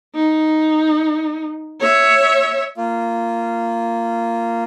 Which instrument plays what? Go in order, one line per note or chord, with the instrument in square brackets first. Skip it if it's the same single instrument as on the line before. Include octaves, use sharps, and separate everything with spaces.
[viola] D#4
C#5 E5
[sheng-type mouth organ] A#3 F4